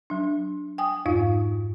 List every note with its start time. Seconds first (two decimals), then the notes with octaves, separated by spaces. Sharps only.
0.10 F#3 D4
0.78 G5 G#5 D#6
1.06 F2 G#2 D#4 F4